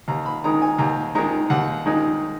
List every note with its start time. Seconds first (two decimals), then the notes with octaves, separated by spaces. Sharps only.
0.08 D#2 A#5
0.26 B5
0.44 D#3 G#3 D#4 A#5
0.62 G#5
0.78 D#2 A#5
1.15 D#3 G#3 D#4 A#5
1.50 D#2 F#5
1.86 D#3 G#3 D#4